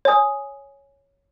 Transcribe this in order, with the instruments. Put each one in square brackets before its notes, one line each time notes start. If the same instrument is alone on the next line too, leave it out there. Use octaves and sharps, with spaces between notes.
[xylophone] C#5 G#5 D#6